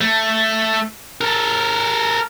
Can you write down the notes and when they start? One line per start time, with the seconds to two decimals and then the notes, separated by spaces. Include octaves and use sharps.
0.01 A3
1.21 A4 A#4